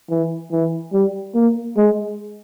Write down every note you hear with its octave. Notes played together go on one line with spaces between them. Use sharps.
E3
E3
G3
A#3
G#3